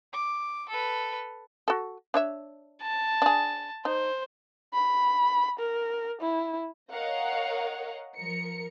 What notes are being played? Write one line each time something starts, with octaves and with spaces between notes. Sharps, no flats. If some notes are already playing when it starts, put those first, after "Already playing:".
D6
A4 B4
F#4 A4
D4 C#5 E5
A5
D4 G#4
D#4 C5
B5
A#4
E4
A#4 C#5 D#5 F5 F#5
F3 A#4 C#7